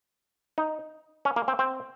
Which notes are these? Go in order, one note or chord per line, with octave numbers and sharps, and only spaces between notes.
D#4
C#4
A#3
C4
C4